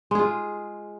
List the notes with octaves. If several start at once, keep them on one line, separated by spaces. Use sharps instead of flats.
G#3 F4 G#4